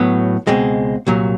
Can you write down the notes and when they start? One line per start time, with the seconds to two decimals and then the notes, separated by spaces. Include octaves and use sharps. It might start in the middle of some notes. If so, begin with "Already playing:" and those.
Already playing: A2 F#3 B3
0.47 C#2 B2 G#3 C4
1.07 C2 A#2 F#3